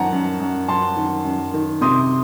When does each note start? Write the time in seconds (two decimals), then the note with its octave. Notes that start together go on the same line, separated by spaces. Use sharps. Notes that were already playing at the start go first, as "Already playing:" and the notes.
Already playing: F#2 D#3 F#5 A5 A#5
0.13 F#2
0.40 F#2
0.68 F#2 A5 C6
0.97 D#3
1.25 F#2
1.54 D#3
1.81 C3 C6 D#6